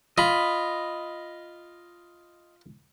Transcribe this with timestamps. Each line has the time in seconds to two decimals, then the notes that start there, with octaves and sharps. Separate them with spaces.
0.18 F4 D#5 B5